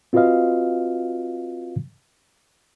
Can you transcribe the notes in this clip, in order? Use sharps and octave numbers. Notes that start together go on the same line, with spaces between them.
C4 F4 F#4 B4 D#5 F5